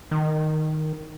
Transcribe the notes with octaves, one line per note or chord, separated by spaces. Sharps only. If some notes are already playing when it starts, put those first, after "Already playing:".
D#3